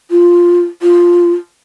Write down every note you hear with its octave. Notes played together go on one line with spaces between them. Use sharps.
F4
F4